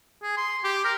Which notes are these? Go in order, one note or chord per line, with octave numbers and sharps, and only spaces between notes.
G#4
C6
G4
A#4